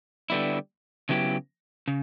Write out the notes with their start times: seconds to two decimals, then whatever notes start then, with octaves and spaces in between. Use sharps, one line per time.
0.30 D3 G3 B3 E4
1.09 C#3 F#3 B3 E4 G4
1.88 C#3